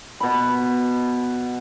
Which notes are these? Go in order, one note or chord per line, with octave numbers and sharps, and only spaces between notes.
B2 B5